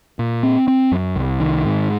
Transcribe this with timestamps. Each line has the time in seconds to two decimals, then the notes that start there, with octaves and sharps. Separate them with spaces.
0.19 A#2
0.43 C4
0.68 C4
0.92 F#2
1.16 C2
1.40 D#3
1.65 G#2